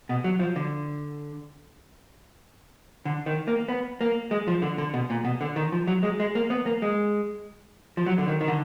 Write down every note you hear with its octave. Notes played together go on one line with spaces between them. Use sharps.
B2
F#3
F3
D3
D3
D#3
A#3
B3
A#3
G#3
F3
D3
D3
B2
A#2
B2
D3
D#3
F3
F#3
G#3
G#3
A#3
B3
A#3
G#3
F3
F#3
D3
D#3
D#3
D3